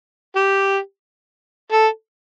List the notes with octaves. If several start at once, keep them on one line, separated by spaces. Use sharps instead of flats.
G4
A4